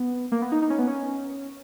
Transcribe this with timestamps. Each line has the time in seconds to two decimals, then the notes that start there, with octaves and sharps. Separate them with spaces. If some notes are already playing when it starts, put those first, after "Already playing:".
Already playing: B3
0.32 A#3
0.42 B3
0.52 D#4
0.62 D#4
0.70 C#4
0.78 B3
0.87 C#4